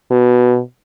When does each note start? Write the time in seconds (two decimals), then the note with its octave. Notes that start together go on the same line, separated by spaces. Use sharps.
0.11 B2